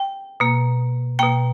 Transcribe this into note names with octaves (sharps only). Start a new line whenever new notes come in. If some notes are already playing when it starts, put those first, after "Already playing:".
Already playing: G5
B2 A#3
B2 A#3 G5